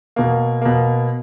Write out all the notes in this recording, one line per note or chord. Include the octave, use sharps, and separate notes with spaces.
B2 A#3
B2 A#3